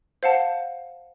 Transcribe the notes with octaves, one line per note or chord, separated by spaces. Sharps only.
C5 F5 F#5 A5